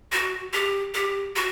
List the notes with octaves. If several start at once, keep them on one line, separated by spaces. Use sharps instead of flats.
F#4
G4
G4
F#4